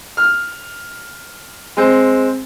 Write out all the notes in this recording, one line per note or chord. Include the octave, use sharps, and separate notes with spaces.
F6
G#3 C4